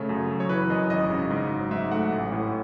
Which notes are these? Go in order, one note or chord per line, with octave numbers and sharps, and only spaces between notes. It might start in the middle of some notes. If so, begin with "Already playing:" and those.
Already playing: C#3 A3 C#5
F#2
F#3
C#5
E3 B4
F#2 D#5
G#1 D#5
C#3
G#2
F#3
G#2 E5
A3 F#5
A1
A2